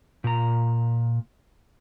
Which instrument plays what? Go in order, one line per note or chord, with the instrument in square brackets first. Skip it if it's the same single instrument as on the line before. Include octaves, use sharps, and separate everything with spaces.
[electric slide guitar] A#2 A#5